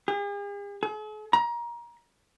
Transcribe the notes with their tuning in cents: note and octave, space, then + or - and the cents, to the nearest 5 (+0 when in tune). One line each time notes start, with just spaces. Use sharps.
G#4 -45
G#4 +45
A#5 +25